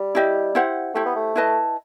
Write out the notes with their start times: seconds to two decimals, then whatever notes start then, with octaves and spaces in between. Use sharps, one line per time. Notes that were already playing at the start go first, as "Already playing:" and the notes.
Already playing: G3
0.15 E4 G4 D#5
0.55 E4 G4 C5 F#5
0.94 A3 E4 G4 C5
1.06 B3
1.16 A3
1.36 E4 B4 D#5 A5